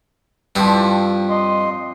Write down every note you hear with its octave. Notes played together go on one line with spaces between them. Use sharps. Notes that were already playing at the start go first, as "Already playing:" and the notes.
G2 F3 C4 D4 E4
D#5 C6